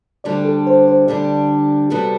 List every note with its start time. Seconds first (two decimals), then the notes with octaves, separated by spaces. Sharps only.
0.24 D2 D3 G3 D4 G4 D5
0.45 A4
0.67 C5
0.88 C5
1.07 D2 D3 G3 D4 G4 D5
1.90 C3 G3 B3 F#4 A4